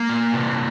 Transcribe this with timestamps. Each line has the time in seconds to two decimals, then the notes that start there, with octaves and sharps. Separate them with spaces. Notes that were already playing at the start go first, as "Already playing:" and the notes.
Already playing: A#3
0.09 A#2
0.34 C3